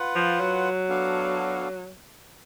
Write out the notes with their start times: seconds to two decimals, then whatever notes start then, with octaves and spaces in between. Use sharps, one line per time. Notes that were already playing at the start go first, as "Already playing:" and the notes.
Already playing: F4 B4 F#5
0.15 F3
0.40 F#3
0.89 B3 D4 F#4 A4 F5